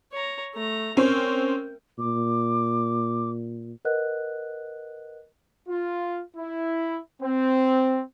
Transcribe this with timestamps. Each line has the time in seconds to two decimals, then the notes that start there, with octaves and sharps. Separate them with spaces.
0.12 C#5 A#5
0.54 A3 A#5
0.97 C4 C#4 A#4 G5
1.99 A#2 D6
3.85 A#4 B4 D#5 F#5 F#6
5.69 F4
6.37 E4
7.22 C4